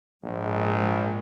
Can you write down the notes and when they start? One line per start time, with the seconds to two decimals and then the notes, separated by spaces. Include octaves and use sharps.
0.23 A#1 G#2 F3 G#3